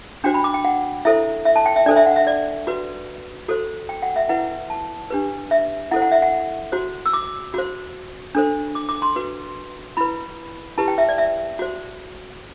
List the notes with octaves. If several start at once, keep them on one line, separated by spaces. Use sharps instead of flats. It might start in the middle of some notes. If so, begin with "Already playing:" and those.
D4 F#4 C5 G5
B5
D6
G5
F#5
E4 A4 C5 E5
E5
A5
G5
E5
D4 A4 C5 D5
E5
F#5
E5
D5
F#4 B4
F#4 A4 C5
G5
F#5
E5
E4 B4 F#5
A5
D4 G4 B4
E5
E4 A4 C5 F#5
F#5
E5
F#5
F#4 C5
E6
D6
F#4 C5
D4 A4 C5
D6
D6
C6
F#4 B4
E4 B4 B5
E4 G4 B4 A5
G5
E5
D5
E5
F#4 C5